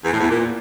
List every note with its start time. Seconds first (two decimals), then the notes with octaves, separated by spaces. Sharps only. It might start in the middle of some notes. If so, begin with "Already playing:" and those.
0.04 E2
0.12 A2
0.20 E2
0.29 A#2